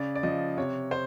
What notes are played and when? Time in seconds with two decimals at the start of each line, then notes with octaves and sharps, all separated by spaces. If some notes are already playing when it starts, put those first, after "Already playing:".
Already playing: C#3 D5
0.15 D5
0.23 F3 D#5
0.57 C3 C#5
0.91 C5